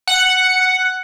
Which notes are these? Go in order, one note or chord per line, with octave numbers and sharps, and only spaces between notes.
F#5